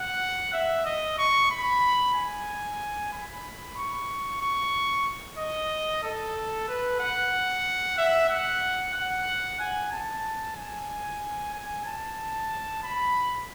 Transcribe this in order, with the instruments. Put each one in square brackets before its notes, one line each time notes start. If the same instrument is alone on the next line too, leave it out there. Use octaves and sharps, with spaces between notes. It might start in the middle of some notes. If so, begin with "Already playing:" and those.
Already playing: [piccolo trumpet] F#5
E5
D#5
C#6
B5
G#5
B5
C#6
C#6
D#5
A4
B4
F#5
E5
F#5
F#5
G#5
A5
G#5
G#5
A5
B5